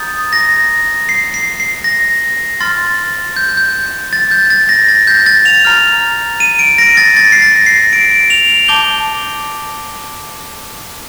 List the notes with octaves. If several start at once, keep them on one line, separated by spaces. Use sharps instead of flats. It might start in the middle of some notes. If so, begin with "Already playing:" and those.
Already playing: A#5 D#6 G6 A6
A#6
C7
C7
C7
A#6
C6 F6 A6
G6
G6
A6
G6
A6
A#6
A6
G6
A6
F7
A#5 F6
D#7
D7
A#6
A6
A6
C7
A#6
C7
D7
F7
A5 D6 G6 G7